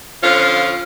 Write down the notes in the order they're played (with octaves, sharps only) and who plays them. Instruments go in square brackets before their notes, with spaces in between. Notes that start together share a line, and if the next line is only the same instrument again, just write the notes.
[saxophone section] D3 F3 C#4 F4 F5